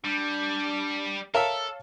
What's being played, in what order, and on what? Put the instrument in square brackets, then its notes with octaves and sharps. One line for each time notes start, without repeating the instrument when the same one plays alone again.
[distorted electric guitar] G3 [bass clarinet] D4
[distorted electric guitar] A4 [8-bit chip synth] A#4 E5 [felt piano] C#5 F5 A5